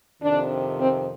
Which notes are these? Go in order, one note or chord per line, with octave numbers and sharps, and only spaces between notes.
F2 C3 D#3 D4
C4